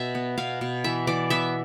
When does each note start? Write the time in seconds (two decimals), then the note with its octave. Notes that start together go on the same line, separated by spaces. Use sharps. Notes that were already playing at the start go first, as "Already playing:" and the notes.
Already playing: B2 E5
0.15 B3
0.38 B2 F5
0.61 B2
0.84 E3 E5
1.07 E3 D5
1.30 B3 E5